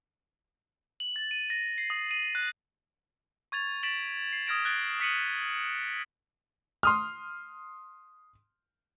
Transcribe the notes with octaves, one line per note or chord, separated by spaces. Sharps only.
F#7
A6
D#7
A#6
C7
D#6
D#7
F#6
C#6 G#6 A6 F7
A6 B6 D7 E7 F#7
C7
D#6 F6 G#6 A#6 D7 E7
F#6 G#6 A6 B6 D7 G7
D#6 B6 C#7 D#7 F#7
C6 D#6 F6